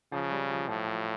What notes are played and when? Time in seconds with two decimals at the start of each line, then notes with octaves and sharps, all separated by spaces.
0.12 C#3 F3
0.31 G3
0.51 F3
0.69 A2 F3
0.88 F3